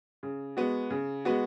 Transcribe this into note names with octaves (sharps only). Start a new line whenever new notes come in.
C#3
G#3 B3 F#4
C#3
G#3 B3 F#4